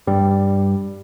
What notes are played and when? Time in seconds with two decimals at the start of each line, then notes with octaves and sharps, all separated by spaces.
0.07 G2 G3